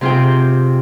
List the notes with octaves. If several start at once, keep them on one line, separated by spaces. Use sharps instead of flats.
C3 C4 F4 G#4 G5